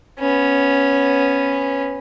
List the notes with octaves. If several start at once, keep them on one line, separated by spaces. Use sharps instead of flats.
B3 C#4